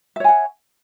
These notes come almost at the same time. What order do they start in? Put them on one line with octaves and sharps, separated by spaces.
E5 C#5 G#5 F#5